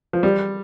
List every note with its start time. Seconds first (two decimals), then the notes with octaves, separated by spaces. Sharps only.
0.13 F3
0.23 G3